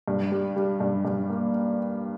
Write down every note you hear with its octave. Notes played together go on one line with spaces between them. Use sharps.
G2
G3
G3
G2
G2
A#3